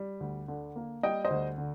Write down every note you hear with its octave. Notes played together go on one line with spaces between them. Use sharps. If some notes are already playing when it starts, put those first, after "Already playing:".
Already playing: G3
D2
D3
A#3
G3 D#5 G5
C5 D#5
D2
D3